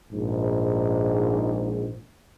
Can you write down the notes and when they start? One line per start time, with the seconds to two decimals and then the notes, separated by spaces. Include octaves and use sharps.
0.12 A#1 G#2